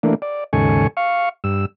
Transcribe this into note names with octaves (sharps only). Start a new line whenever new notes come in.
E3 A3 A#3 D4
D5
D#2 G#2 C#3 A4 G#5 C#6
F5 C#6
G2 E6